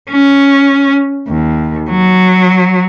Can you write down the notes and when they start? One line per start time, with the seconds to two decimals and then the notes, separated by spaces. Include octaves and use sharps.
0.10 C#4
1.28 D#2
1.90 F#3